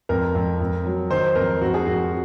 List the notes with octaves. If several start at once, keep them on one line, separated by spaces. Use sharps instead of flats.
F2 A#4
F2
F2
F#3
D#3 C5
F2 A#4
F2 F#4
G#4
F2 F#4